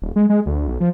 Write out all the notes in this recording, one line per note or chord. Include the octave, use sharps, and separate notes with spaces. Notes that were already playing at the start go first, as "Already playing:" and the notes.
D#1
G#3
G#3
D2
B1
F3